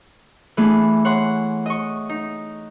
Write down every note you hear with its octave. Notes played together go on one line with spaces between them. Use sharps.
E3 A3 B3 D4 G#4
C#5 F#5 C6
D#5 C#6
D#4